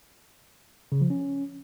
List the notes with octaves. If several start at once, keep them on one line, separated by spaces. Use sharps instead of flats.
C#3
F3
C#4